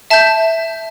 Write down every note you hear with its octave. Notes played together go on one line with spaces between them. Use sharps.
E5 A5 G6